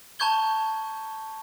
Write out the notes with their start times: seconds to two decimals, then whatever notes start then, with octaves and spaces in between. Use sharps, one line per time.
0.19 A5 A#5 C#6 G6 G#6 G7